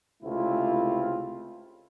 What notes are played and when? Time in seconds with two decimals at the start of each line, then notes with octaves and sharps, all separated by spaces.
0.23 C#2 C3 A3 C4 E4 F4